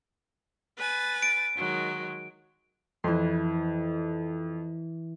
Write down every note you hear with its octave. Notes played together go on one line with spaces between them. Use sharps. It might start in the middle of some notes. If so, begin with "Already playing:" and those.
B4 G#5 A6
D7
D#3 F#3 G#3
F2 E3 C6